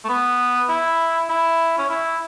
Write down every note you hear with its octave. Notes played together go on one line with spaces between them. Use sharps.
A3
B3
E4
E4
C#4
E4